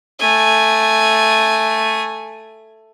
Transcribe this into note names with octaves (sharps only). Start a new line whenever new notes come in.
A3 G#5